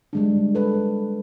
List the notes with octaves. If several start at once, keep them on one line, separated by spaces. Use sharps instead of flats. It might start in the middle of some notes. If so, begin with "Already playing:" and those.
G3 G#3 D4
A4 B4